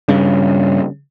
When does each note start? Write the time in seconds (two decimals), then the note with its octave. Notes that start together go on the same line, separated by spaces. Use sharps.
0.08 G2 C#3